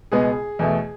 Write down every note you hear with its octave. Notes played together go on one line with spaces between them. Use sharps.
C#2 B2 G#3 B3 G#4
E2 B2 A3